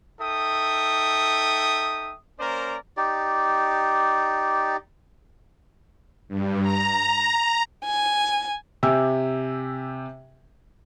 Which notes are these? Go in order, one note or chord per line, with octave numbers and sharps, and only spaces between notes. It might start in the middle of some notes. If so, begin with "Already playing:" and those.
D#4 A4 E5 G5 D#6
A#3 C#4 A#4 C5 D5 A#5
D#4 G4 D5
G2
A#5
G#5
C3 G4 G#5 E6